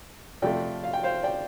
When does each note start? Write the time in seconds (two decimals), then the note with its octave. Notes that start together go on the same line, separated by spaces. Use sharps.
0.42 F2 C3 A3 F4 D5 G5
0.84 F5
0.93 G5
1.03 C5 F5
1.23 D5 G5